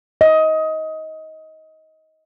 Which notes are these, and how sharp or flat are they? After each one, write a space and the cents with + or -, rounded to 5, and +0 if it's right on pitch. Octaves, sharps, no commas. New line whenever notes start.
D#5 +20